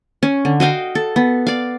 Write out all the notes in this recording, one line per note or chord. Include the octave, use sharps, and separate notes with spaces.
C#4
D3
F#4 D#5 F5 G5
A4
B3
D5 F5